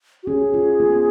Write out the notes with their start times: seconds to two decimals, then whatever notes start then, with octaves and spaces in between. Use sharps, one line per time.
0.23 F#4
0.27 C#4 G#4
0.54 F4
0.80 B3